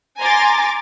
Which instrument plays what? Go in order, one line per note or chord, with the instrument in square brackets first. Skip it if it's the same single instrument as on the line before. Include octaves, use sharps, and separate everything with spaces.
[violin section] G#5 A#5 C6 D6 A6